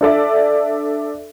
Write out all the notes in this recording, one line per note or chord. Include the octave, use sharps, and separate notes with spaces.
D4 A4 D5 E5